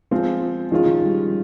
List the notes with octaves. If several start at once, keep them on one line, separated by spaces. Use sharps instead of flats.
F3 G#3 C4 F4
D#3 F3 G#3 C#4 F4
F3
G3